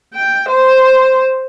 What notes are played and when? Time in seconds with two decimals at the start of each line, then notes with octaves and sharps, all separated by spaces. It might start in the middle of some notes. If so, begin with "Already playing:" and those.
0.14 G5
0.49 C5